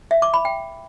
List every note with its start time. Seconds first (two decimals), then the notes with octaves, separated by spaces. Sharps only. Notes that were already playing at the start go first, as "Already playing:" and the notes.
0.11 E5
0.22 D6
0.34 B5
0.45 G5